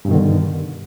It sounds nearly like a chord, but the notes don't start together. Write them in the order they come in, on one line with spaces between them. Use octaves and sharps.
G2 B2 D#3 D3